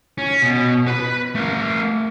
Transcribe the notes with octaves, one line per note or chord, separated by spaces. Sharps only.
C#4
B2
B4 B5
A3 A#4